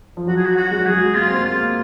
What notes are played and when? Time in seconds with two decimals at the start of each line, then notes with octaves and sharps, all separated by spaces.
0.17 F3
0.27 F#3 F#4
0.36 G#4
0.45 F#4
0.56 F#4
0.71 G#3
0.80 F#3
0.85 G#3 G#4
1.14 A#3 F4
1.27 C4
1.38 A#3
1.44 F4